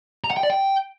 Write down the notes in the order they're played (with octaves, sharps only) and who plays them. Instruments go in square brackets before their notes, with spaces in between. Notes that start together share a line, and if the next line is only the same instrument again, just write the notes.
[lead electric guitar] A#5
F#5
G5
D5
G5